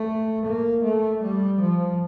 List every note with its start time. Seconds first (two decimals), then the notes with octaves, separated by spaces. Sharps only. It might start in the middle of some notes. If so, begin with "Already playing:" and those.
Already playing: A3
0.45 A#3
0.83 A3
1.22 G3
1.60 F3